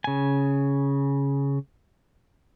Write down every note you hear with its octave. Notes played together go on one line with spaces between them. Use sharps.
C#3 G#5